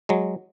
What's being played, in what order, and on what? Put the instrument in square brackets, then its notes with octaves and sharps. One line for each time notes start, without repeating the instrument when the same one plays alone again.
[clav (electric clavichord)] F#3 G#3